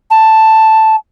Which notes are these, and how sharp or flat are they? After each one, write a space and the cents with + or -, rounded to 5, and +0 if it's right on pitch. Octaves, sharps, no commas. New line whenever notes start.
A5 +0